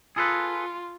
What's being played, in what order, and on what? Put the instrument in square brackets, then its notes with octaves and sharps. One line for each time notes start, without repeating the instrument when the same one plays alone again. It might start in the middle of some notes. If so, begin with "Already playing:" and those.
[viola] F4 [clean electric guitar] G#4 A4 B4